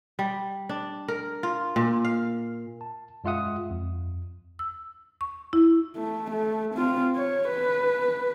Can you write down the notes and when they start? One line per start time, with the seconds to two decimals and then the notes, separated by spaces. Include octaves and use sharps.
0.19 G3
0.69 D4
1.08 A#4
1.43 F4
1.76 A#2
2.05 F5
2.81 A5
3.24 F#2 G#3 F4 E5 F#5 D#6
3.70 F2
4.59 E6
5.21 C#6
5.53 E4
5.96 A3
6.31 A3
6.75 C4 F4
7.16 C#5
7.49 B4